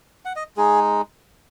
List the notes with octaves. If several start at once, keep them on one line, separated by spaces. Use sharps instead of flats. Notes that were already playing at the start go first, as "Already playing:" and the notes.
F#5
D#5
G#3 D#4 G#4